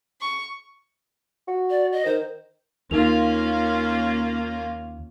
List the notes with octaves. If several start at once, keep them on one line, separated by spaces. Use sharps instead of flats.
C#6
F#4
D5
D#5
D#3 C5
D#2 A#3 C#4 D#4 F4 A#4 F7